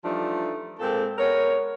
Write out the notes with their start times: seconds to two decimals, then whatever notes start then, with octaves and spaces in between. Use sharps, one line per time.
0.04 E3 F3 G3 A3 D4 D#4
0.79 A#2 G#3 A#3 C4 A4
1.18 G#3 B3 A#4 C#5